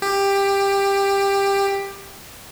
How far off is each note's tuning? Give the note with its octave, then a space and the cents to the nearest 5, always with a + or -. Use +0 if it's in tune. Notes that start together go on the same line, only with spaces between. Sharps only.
G4 +15